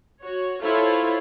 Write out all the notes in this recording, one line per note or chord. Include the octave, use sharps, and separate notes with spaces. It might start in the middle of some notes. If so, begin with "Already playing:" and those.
F#4 C#5
E4 F4 A4 C5 C#5